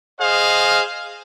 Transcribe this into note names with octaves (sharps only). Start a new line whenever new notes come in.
G#4 C5 D#5 F5